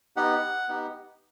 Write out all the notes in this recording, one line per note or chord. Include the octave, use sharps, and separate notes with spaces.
B3 D#4 G4 F#5
B3 D#4 G4